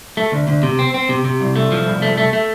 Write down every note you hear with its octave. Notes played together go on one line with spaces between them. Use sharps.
A3
D2
D2
C3
C4
C4
C3
C3
C2
A3
F3
C2
A3
A3
A3